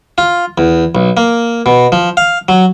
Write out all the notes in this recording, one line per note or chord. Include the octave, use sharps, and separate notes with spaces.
F4
E2
B1
A#3
B2
F3
F5
F#3